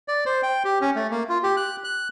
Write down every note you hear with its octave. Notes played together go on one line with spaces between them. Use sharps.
D5
C5
G5
G4
C#4
A3
A#3
F4
G4
F#6
F#6